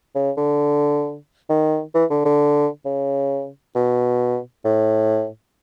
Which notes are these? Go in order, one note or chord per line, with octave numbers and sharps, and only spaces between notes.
C#3
D3
D#3
E3
D3
D3
C#3
B2
A2